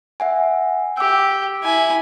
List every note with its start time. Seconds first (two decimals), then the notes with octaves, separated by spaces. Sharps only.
0.20 E5 F#5 G#5
0.97 G4 D6 E6
1.63 E4 G#5